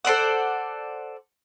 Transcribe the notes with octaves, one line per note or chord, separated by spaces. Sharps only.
A4 C5 D5 F#5